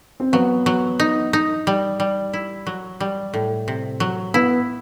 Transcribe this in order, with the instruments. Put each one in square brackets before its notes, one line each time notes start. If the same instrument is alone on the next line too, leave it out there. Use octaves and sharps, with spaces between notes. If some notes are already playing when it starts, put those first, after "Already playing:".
[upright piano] C4
[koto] F#3 [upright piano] B3
[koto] F#3
D#4
D#4
G3
G3
E4
F#3
G3
A2
C3
F#3
[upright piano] B3 [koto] E4